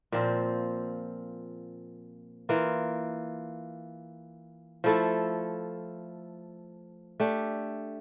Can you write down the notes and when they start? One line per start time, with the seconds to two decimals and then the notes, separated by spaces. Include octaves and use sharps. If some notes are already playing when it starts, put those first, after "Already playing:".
0.12 A#2 F3 C4
2.49 E3 A#3 F4
4.84 F3 A3 E4 A4
7.20 A3 D4 G4